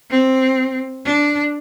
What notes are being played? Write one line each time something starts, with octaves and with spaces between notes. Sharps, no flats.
C4
D4